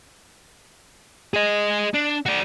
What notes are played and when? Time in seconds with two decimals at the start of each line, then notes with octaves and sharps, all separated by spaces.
1.34 G#4 D#5
1.94 D4
2.26 F#4 D5